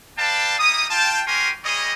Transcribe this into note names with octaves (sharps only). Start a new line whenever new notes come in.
B4 D5 F5 G5 A5
G3 D#4 E4 D#6
F4 G5 A5
C#4 F#4 G4 A#4 G#5 C6
G3 E4 G#4 C#5 D#5